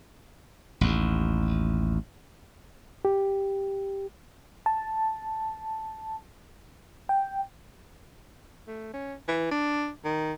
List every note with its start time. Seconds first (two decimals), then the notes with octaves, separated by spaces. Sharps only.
0.81 A1 D#2
3.05 G4
4.66 A5
7.09 G5
8.68 A3
8.94 C#4
9.28 E3
9.51 D4
10.05 D#3